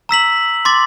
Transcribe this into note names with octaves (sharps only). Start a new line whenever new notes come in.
A#5 E6 B6 F#7
C6 D6 A6